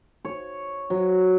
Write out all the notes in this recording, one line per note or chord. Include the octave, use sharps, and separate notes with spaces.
C#5
F#3